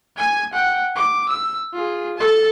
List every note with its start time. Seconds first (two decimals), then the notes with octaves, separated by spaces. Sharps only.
0.17 G#5 G#6
0.53 F#5 G5
0.95 D6
1.29 E6
1.73 F4 G#4
2.18 A4 A5